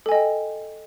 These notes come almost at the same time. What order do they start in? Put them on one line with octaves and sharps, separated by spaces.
A4 G#5 D#5 G5